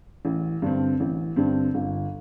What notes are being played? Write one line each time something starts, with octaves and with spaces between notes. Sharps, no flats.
A1
G2 D3 C4
A1
G2 D3 C4
G1